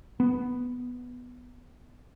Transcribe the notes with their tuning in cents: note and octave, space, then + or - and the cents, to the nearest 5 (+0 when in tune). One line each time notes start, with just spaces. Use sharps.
B3 +0